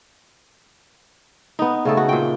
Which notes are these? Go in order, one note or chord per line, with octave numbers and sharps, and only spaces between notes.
B3 D#4
C#3 A3 A4
F#4
A#2 G5